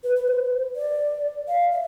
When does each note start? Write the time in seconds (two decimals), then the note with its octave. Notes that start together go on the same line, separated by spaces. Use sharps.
0.04 B4
0.16 B4
0.28 C5
0.76 D5
1.48 F5
1.72 E5